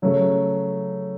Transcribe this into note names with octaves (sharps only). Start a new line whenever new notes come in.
C#3 F#3 A3